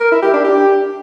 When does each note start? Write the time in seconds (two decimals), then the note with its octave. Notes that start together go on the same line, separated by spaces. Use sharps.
0.01 A#4
0.11 E4
0.22 G4
0.33 D4
0.44 G4